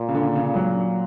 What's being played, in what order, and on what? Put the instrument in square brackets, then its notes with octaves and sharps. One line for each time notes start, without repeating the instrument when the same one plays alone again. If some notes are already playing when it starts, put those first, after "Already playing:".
Already playing: [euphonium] A#2
[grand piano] C#3
D3
C#3
F#3